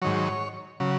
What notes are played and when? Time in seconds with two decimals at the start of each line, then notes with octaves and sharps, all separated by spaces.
0.02 G#2 D#3 F#3 C#5
0.80 C#3 F#3